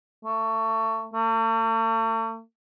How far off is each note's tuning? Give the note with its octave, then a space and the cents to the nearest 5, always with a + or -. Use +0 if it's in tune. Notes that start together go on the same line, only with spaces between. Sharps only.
A3 +25
A3 +45